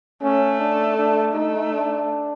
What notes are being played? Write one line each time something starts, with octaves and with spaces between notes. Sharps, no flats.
A3 C#4
D4
D4
A3 D#4
D4